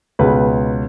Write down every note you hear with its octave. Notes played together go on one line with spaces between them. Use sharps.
C#2 B2 G#3 B4